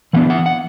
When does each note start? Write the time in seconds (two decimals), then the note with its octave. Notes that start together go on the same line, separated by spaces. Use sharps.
0.13 E3 B3 D4 F#5
0.30 F#5
0.46 F#5